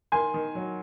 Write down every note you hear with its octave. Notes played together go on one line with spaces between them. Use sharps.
D#3 G#5 C6
D#3
F#3